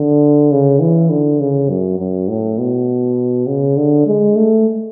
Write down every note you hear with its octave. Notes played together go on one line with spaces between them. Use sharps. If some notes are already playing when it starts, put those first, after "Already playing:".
Already playing: D3
C#3
E3
D3
C#3
F#2
F#2
A2
B2
C#3
D3
G#3
A3